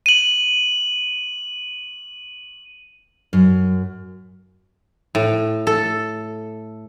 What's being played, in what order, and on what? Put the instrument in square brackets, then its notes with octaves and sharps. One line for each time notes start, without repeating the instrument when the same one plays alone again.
[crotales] D#7 F#7
[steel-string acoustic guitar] F#2
[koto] A2
A4